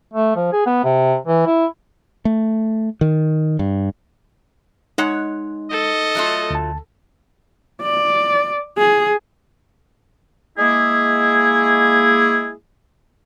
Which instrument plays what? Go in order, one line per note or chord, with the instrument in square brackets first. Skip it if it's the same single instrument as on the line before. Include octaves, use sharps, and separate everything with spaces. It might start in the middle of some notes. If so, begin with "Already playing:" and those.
[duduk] A3
F3
G#4
B3
C3
E3
E4
[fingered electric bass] A3
D#3
G2
[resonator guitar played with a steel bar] G#3 C#5 F#5 [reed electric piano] D#4
[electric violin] A4 [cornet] D#5
[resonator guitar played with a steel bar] F#3 A3 F4
[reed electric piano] D2 A5
[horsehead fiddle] D5
G#4
[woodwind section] G#3 A#3 E4 G#4